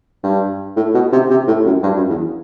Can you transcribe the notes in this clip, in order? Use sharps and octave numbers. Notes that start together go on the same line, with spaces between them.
G2
A2
B2
C3
C3
A2
F#2
G2
F#2
E2